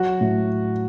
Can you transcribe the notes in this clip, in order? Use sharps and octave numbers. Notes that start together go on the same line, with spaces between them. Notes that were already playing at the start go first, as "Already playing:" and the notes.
Already playing: F#3 F#4
A2